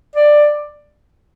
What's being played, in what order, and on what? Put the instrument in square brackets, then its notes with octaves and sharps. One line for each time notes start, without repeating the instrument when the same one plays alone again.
[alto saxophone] D5